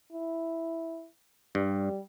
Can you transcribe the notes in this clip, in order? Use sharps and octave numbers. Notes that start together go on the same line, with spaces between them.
E4
G2 G3